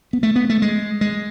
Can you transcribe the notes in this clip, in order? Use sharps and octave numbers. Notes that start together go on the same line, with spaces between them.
B3
A3
B3
A3
G#3
G#3